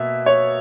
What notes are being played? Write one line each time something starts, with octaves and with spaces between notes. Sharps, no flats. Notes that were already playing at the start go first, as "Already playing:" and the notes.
Already playing: B2 A#3 E5
C#5